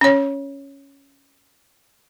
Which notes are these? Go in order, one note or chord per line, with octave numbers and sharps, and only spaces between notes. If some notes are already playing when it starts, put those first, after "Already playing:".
C#4 C#5